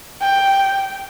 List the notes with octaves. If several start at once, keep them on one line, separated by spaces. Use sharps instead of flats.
G5